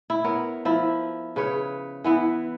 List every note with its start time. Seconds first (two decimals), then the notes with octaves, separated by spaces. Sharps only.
0.10 E4
0.24 B3 A#4 C#5
0.65 F3 E4
1.36 C#3 B4 C#5
2.04 E3 B3 E4